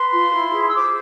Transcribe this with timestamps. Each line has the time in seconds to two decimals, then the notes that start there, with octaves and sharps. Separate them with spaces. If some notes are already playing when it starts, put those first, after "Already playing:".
Already playing: B4 C6
0.11 F4
0.32 E4
0.52 G#4
0.67 E6
0.74 C5 D6